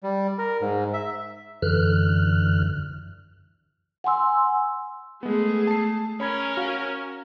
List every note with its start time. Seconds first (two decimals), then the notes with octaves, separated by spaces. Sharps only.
0.03 G3
0.38 A#4
0.61 G#2
0.94 E5
1.62 F#2 D3 E3 F6 F#6
4.04 F#5 G#5 C6 E6
5.23 G#3 A3 B3 G#4
5.67 A5 C7
6.20 C#4 A#4 C#5 B5 G#6
6.57 F#4 F5